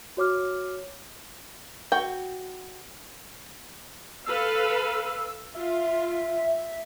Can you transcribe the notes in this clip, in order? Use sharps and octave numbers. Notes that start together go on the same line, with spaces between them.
F#4 C#5 D6 F6
F#4 G5
A4 B4 F5 E6
F4 E5